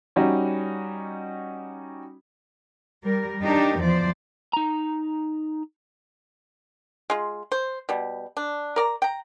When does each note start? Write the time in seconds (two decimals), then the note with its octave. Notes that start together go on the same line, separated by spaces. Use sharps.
0.16 G3 C#4 D#4 F#4
3.04 G3 A#4
3.43 D4 D#4 G4 A#4
3.81 E2 F3 C5 D5
4.53 D#4 A#5
7.10 G#3 F4
7.52 C5
7.89 B2 G3
8.37 D4
8.76 A#4 D5 A#5
9.02 G5 A#5